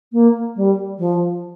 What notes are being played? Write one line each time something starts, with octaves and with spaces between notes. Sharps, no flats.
A#3
G3
F3